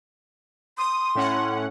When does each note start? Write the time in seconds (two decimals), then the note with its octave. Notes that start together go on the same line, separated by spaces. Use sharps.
0.78 C6 D#6
1.15 A2 C#4 F#5